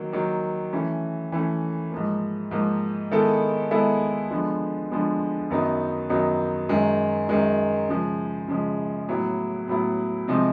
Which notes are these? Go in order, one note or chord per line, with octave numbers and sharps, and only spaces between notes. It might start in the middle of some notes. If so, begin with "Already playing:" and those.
Already playing: D#3 F#3 A#3
D#3 F#3 A#3
E3 A3 C#4
E3 A3 C#4
G#2 F3 A#3
G#2 F3 A#3
D#3 G#3 B3 E4 A4
D#3 G#3 B3 E4 A4
D3 F3 G#3 B3
D3 F3 G#3 B3
F#2 D#3 F#3 B3 D#4
F#2 D#3 F#3 B3 D#4
F#2 D#3 G#3
F#2 D#3 G#3
C#3 F3 G#3
C#3 F3 G#3
A2 F#3 B3 E4
A2 F#3 B3 E4
C3 F3 G#3 C4 D#4